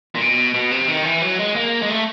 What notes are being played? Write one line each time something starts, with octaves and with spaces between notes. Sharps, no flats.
A#2
B2
B2
C3
D#3
E3
F#3
G#3
A#3
G#3
A3